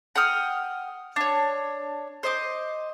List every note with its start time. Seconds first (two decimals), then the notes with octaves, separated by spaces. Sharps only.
0.16 F#5 G5 D#6 F6
1.16 D4 C#5
2.23 C5 D#5 D6